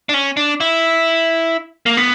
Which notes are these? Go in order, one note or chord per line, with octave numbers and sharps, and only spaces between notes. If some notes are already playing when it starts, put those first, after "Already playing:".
D4
C#4
D4
E4
A#3
B3